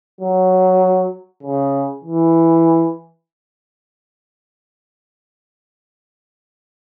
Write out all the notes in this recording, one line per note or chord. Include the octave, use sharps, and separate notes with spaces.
F#3
C#3
E3